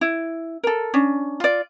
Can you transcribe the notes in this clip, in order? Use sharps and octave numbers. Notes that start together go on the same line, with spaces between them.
E4
A4 A#4
C#4 D4
F4 D5